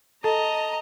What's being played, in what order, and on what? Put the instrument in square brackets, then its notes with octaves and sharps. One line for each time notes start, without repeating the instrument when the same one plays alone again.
[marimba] A4 [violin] D#5 [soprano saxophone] A5 [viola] A#5